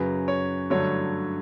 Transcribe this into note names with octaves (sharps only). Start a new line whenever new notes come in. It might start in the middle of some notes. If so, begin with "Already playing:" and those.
Already playing: F#2 C#3 F#3 B4
C#5
G2 D3 F#3 A3 C#5